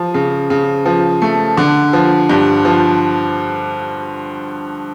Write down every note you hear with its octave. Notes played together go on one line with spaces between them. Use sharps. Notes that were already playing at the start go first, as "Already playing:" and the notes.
Already playing: F3
C#3
C#3
F3
A3
D3
F3
G2
F3